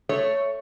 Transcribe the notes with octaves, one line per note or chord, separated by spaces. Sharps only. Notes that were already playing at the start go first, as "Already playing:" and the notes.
A3 C#5